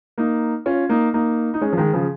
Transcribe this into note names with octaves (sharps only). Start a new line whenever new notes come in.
A#3 D#4
C#4 F4
A#3 D#4
A#3 D#4
D#4
G#3 C#4
F3
D#3 G#3
C#3 F3